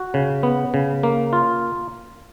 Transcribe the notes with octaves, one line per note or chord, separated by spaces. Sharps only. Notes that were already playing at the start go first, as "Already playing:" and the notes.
Already playing: F#4
C#3
B3
C#3
A#3
F4